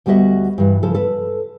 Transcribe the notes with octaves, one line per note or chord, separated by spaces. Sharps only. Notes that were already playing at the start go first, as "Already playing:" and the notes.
D2 G3 B3 F#4 D#5 E5
G2 E3
C#3 F3 A4
A4 B4